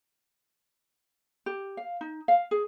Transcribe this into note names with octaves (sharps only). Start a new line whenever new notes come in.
G4
F5
D#4
F5
G#4